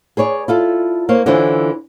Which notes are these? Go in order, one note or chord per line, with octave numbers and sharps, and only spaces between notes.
G#4 B4 C#5 D5
E4 F4 A4
A#3 C5 C#5
D3 E3 C#4 E4 F4 C5